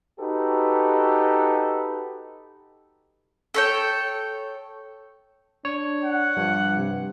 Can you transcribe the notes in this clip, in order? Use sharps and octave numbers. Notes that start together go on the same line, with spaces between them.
D#4 F#4 G4 A4 B4
A4 C#5 G5
D4 C#5
F#5
G2 F3
C3